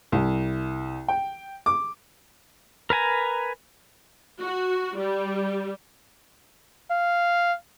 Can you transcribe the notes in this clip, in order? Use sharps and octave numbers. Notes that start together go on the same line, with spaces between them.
C2
G5
D6
A#4 B4 G#5 A#5
F#4
G3
F5